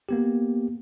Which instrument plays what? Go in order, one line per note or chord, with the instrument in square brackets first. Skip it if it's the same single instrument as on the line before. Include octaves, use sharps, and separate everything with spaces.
[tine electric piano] A#3 B3 G4